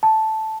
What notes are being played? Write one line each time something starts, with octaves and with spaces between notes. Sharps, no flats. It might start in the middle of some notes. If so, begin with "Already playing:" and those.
A5